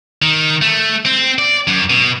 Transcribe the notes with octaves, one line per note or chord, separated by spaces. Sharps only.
D#3
A3
C4
D5
F#2
B2